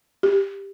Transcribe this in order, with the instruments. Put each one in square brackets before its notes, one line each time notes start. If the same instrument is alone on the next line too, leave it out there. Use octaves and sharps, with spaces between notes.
[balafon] G4